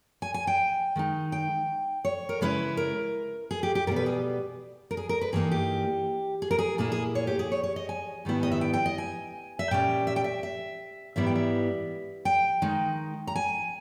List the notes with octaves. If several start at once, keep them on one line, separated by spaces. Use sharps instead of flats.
G#5
G#5
G5
D#3 G#3 D#4
G5
C#5
A#4
C#3 G#3 C#4 E4 B4
A#4
G#4
G4
G4
B2 G3 B3 E4 A#4
B4
G#4
A#4
G#4
A#4
B4
G2 E3 A#3 D#4 G#4
G4
G#4
A#4
G#4
A#2 A#3 E4 G#4
G#4
C#5
G4
G#4
C#5
C#5
D#5
G#5
G#2 D#3 G3 B3 E4
D#5
E5
G5
G5
D#5
G#5
E5
A#2 G3 C#4 G5
E5
G5
E5
E5
G#2 E3 G3 B3 E4 E5
G5
E5
G5
D#3 G#3 D#4
A#5
G#5